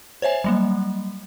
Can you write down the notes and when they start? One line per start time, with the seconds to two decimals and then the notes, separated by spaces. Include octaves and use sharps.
0.22 C5 C#5 E5 G#5
0.44 F#3 G3 A#3